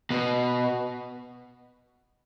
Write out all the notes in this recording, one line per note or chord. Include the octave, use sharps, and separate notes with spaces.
B2